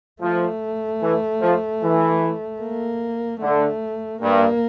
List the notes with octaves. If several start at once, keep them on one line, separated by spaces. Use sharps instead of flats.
F3 A3
E3
F3
E3
A#3
D3 A3
G2 A#3